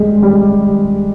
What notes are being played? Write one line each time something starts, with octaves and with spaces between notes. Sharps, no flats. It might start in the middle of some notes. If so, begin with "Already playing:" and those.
Already playing: G3 G#3
G3